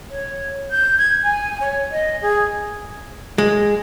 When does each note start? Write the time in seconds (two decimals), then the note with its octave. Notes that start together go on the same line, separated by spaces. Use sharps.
0.10 C#5
0.71 G6
0.98 G#6
1.23 G#5
1.60 C#5
1.91 D#5
2.21 G#4
3.38 G#3